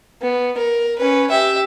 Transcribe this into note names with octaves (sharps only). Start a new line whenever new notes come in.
B3
A#4
C#4 B4
G4 E5